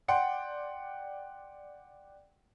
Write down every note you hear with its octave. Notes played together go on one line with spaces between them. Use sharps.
D5 F#5 G5 C6